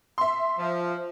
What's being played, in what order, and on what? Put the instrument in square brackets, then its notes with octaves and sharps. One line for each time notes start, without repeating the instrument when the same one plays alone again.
[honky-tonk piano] E5 C6
[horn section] F3